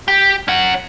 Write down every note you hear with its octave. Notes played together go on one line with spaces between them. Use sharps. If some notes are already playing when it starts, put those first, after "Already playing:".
G4
C#4 F#5